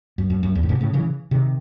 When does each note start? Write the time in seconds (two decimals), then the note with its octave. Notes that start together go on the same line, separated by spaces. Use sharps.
0.18 F#2
0.30 F#2
0.43 F#2
0.55 E2
0.63 A2
0.69 G#2 C3
0.81 A2 C#3
0.93 C#3 E3
1.31 C3 D#3